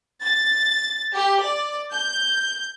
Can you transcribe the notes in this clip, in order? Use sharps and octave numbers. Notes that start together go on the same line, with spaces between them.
A6
G4
D5
G6